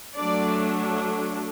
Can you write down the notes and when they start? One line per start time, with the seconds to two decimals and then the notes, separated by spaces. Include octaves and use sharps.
0.18 F#3 A3 D4 D5